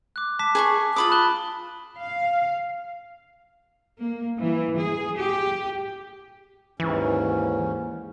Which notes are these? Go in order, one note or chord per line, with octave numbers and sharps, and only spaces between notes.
D6 F#6
A5 D6 B6
G#4 B5 C#6
F4 B5 D6 D#6
A5 F#6 G7
F5
A#3
E3
G#4
G4
D#2 G#2 E3 C#4